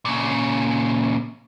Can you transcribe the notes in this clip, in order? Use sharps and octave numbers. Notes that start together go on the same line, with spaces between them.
A#2 C#3